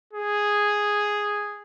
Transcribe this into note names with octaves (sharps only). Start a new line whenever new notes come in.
G#4